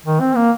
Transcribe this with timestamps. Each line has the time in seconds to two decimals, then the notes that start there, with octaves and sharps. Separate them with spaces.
0.06 D#3
0.20 C4
0.35 A#3